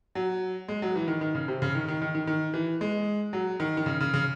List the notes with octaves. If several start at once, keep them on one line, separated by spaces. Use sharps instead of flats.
F#3
G#3
F#3
E3
D#3
D#3
C#3
C3
C#3
D#3
D#3
D#3
D#3
D#3
E3
G#3
F#3
D#3
D#3
C#3
C#3
C#3